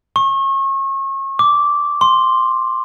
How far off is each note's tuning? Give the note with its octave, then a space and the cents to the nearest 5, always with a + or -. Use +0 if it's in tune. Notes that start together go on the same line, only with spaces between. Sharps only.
C#6 -35
D6 -10
C6 +5